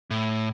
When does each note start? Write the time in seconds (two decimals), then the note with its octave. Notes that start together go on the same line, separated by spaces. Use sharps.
0.11 A2